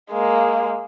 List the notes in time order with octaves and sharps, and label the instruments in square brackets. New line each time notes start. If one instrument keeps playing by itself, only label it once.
[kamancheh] G#3 A#3